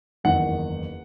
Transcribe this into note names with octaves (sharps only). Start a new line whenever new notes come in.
F#1 E2 D#3 F#5